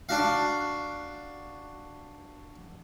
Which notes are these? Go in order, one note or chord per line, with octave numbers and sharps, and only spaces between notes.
D4 F#4 F5